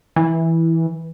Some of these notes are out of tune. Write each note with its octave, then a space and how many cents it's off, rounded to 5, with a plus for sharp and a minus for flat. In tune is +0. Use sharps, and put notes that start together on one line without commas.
E3 -10